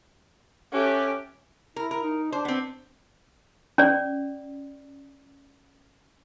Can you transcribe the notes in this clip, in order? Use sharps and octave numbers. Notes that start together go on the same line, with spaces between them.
C#4 G4 A4 E5 F#6
E4 A#4
A#4
D#4
D4 C5
B3 C4
C#4 D5